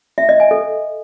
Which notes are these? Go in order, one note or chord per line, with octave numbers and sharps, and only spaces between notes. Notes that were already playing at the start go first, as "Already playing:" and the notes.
E5
D#5
G#5
A4